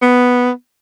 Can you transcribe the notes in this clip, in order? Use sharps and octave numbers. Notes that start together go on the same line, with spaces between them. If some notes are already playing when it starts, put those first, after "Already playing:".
B3